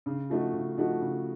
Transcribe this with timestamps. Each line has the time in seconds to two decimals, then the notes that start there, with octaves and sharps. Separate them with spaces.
0.06 C#3
0.30 F3 A3 D#4 F#4
0.53 C#3
0.77 F3 A3 D#4 F#4
1.01 C#3